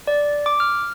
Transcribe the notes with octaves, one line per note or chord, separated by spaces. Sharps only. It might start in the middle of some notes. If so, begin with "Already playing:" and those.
D5
D6
F6